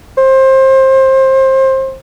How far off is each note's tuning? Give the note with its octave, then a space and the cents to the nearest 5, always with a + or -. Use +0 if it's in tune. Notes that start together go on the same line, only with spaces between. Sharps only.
C5 +25